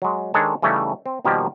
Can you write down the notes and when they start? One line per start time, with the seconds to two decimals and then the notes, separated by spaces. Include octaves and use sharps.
0.02 F#3 G#3
0.34 D#3 G#3 D4 G#4 A4 C#5
0.62 C#3 E3 G3 A3 C#4 D#4
1.06 C4
1.25 B2 D#3 F3 G3 A#3 G4